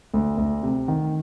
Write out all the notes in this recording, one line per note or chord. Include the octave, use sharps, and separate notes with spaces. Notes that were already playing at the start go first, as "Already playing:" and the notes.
D2
D2
C3
D#3